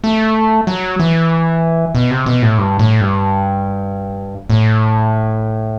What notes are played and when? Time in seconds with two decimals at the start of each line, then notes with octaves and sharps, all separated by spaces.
0.04 A3
0.67 F#3
0.99 E3
1.95 B2
2.11 C3
2.26 B2
2.42 A2
2.58 G2
2.79 A2
3.01 G2
4.50 A2